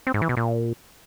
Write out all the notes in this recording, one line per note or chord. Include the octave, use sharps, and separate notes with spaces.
C4
G#2
E3
B2
A#2